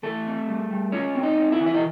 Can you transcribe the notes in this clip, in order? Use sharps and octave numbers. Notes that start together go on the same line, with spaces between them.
E3 A3 A4
C4
G3
G3
C#4 F4 C#5
C4
D#4 D#5
C4
E4 E5
E3
E5
D#5